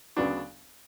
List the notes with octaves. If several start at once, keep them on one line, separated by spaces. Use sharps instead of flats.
D2 C#3 F#3 B3 D4